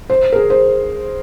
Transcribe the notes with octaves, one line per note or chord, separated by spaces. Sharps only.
C5
A#4
G#4
C5